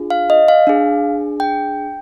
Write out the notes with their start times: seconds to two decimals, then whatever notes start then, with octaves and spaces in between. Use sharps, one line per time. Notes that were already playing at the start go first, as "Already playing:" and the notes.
Already playing: D4 F4 G#4
0.10 F5
0.30 D#5
0.48 F5
0.67 D4 G#4
1.40 G5